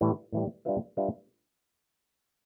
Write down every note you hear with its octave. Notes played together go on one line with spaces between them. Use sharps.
A2 E3 G3
A2 E3 G3
G3 D4 F4 B4 E5
G3 D4 F4 B4 E5